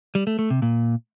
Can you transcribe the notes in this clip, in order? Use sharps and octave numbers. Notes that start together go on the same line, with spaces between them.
G3
A3
A3
C3
A#2